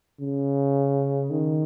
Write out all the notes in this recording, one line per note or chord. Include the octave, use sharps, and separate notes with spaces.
C#3
D#3